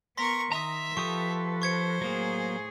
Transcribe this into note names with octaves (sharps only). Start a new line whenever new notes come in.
B3 A#4 C6 C#6 A#6 B6
D#3 E5 A#5 D#6
F3 G4 A4 B4 C#6 D#6
C5 C#6 G#6 C#7
A2 F#3 A#3 G#4